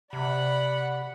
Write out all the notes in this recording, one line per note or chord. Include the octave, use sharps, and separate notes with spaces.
C3 D5 F#5 B5